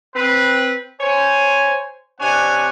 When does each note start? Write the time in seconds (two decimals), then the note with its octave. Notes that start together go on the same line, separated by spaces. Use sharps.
0.16 C4 B4
1.00 C5 C#5 G#5
2.20 C3 C4 D4 C#5 F#5 G#5